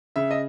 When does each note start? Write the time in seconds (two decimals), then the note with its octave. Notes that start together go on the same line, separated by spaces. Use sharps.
0.16 C#3 E5
0.31 D#5